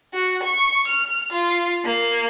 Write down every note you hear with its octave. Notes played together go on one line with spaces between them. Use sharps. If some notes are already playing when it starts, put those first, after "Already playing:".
F#4
C#6
F6
F4
A#3